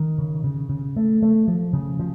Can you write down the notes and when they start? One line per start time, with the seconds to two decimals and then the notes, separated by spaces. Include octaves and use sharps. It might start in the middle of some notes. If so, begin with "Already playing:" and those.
Already playing: D#3
0.18 C#3
0.44 C#3
0.69 C#3
0.96 A3
1.22 A3
1.48 F3
1.73 C#3
1.99 F3